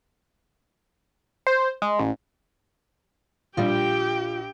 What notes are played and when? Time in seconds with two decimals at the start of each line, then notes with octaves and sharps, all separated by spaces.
1.47 C5
1.82 G#3
1.99 A1
3.57 A#1 G3 F4 G4 G5